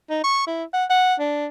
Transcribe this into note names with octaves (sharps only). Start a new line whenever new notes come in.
D#4
C#6
E4
F#5
F#5
D4